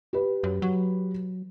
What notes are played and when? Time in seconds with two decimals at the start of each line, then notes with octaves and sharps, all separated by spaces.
0.13 G4 B4
0.43 F#2
0.62 F#3